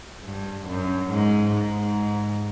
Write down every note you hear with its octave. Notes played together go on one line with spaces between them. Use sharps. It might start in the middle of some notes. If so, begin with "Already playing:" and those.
G2
F#2
G#2
G#2